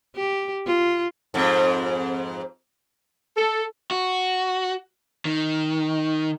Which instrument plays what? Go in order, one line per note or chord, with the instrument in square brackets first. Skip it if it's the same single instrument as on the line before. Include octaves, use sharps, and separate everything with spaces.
[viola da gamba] G4
F4
[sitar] F2 G#2
[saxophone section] A4
[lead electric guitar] F#4
D#3